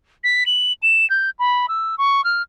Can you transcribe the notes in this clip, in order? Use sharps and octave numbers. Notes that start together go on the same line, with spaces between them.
B6
F#7
E7
G6
B5
E6
C#6
F6